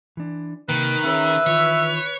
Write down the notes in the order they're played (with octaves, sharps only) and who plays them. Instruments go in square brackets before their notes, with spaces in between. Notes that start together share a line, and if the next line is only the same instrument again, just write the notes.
[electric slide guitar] E3 D4
[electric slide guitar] C3 A#3 [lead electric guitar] D#3 [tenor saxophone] B4
[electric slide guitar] C#4 G#4 C#5 [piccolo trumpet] E5
[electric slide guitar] D#3 E3 F4 [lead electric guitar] C#5